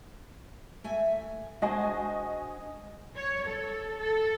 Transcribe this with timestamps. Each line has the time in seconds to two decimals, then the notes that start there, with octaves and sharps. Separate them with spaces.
0.84 A3 E5 G#5
1.62 G#3 D4 F#4 C5 D#5 G#5
3.16 C#5
3.47 A4
3.99 A4